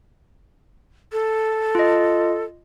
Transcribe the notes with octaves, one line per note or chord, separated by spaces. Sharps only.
A4
F4 D#5